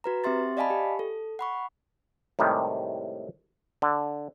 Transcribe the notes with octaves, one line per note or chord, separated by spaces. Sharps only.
F#4 B4 A#5
C4 G4 E5 C6 A6
D5 D#5 F5 G#5 A5 B5
G4
A4
F#5 B5 C#6
A2 C3 D#3 G3 G#3
D3